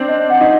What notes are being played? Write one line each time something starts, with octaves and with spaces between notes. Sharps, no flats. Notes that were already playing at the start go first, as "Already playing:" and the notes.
Already playing: C4 D4 C5
D#5
F#5
D#4